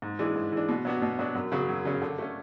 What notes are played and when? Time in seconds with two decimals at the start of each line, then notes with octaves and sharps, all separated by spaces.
0.02 G#2
0.19 E3 G#3 D4
0.36 G#2
0.52 E3 G#3 D4
0.69 B2
0.85 F#3 B3 D4 F#4
1.02 B2
1.19 F#3 B3 D4 F#4
1.35 F#2
1.52 C#3 F#3 C#4
1.69 F#2
1.85 C#3 F#3 C#4
2.02 D3
2.18 A3 C#4